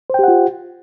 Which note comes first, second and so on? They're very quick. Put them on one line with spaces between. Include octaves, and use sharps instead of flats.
C5 G5 G4 F#5 F4